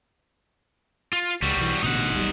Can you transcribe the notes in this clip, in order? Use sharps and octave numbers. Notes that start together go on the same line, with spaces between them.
F4
C#2 G3 F#4
B1 E3
A1 B2 D3 D#4 F#5
E1 B1 G3